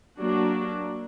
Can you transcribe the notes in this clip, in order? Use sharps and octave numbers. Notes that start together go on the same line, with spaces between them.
F#3 A#3 D4 F#4